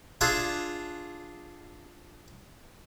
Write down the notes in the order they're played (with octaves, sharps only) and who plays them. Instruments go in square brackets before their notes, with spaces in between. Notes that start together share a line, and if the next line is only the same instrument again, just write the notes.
[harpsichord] D4 F4 G#4 E5 G#5